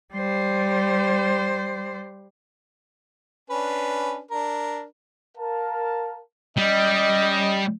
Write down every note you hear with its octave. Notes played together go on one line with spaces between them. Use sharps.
G3 C5
C#4 D4 B4
D4 A#4
A#4 F5 A5
G3 C#4 D#5